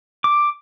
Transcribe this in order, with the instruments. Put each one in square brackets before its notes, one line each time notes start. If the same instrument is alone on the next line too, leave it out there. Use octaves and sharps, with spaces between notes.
[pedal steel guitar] D6